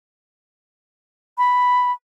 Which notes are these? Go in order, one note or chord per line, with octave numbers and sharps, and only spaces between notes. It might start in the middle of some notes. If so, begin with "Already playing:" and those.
B5